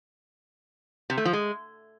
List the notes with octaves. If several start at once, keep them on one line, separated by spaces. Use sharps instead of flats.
C3
A3
F3
G#3